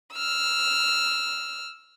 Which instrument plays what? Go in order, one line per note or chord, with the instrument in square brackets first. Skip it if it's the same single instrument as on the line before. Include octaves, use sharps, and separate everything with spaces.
[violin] E6 F6